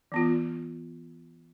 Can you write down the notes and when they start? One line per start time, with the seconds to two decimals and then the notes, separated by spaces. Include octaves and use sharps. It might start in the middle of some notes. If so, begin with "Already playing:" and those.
0.12 E3 B3 F4